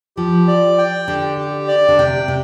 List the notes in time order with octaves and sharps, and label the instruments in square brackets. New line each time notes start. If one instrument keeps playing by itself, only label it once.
[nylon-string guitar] F3 [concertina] G4
[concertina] D5
G5
[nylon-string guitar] D3 [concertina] G4
[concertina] G4
D5
[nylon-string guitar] D3
[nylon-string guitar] C3 [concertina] G5
[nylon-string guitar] C3